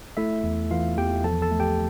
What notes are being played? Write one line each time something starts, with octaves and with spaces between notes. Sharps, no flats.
A3 E4 E5
E2
E3 F4 F5
E2 G4 G5
F3 A4 A5
A4 A5
A3
G4 G5